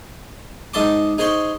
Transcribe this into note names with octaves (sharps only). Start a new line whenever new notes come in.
G#2 D#5 E5 A5 C6 D6
D#4 G#4 C5 C6 C#6